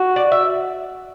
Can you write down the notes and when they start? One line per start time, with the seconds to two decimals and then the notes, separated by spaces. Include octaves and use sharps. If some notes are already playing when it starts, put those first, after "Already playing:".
Already playing: F#4
0.16 D5
0.32 E5